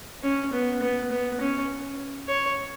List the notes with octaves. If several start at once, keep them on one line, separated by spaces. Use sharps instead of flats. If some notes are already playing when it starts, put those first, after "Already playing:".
C#4
B3
B3
B3
C#4
C#5